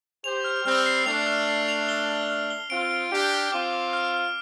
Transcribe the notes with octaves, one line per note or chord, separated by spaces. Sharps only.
G4 C5 F7
F6
G3 C4 F6
C7
A3 D4 F7
F6
C7
F7
G7
F6
F6
G7
C4 F4 D7
D7
D4 G4 D7
F6
C4 F4 D6
D6
F6
F6